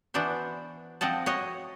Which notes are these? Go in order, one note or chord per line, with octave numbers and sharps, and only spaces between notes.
E3 B3 D4 F#4 C5
F3 C4 D#5 F#5 A5
F#4 C#5 D#5